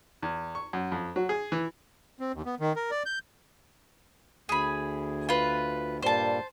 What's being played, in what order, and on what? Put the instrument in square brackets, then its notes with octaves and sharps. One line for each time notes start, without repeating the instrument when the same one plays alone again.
[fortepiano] E2
C#6
F#2
F2
F#3
G#4
E3
[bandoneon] C4
D#2
B3
D#3
A#4
D5
G6
[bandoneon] D2 [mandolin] G#4 B5
[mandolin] F4 B4
[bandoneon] G2 A#2 G3 [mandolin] C5 A5